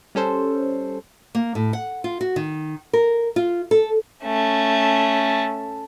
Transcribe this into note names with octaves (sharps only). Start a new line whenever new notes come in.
G3 C#4 A4 C5
A#3
A2
F#5
F4
F#4
D#3
A#4
F4
A4
A3 C#4